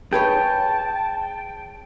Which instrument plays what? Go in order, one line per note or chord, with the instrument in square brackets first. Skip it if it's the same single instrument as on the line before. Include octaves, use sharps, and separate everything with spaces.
[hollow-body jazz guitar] G#4 B4 C#5 [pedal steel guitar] G5 [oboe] A5